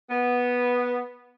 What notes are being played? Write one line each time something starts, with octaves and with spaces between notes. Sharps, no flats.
B3